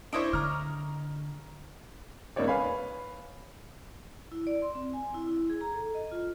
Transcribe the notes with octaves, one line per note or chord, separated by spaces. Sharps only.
D4 E4 C5 C#5 D#5 D6
D3 A#5 F6
G1 C#2 A#3 D#4 C#5 D5
B4 C#5 F5 G#5 B5
E4
D5
C6
C4
G#5
E4
E4
G#4
A#5
A4
D#5
F4